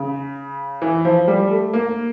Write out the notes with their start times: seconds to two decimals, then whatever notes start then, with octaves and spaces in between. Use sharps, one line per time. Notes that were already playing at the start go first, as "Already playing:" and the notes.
Already playing: C#3
0.82 E3
1.05 F3
1.28 G3
1.51 A3
1.73 A#3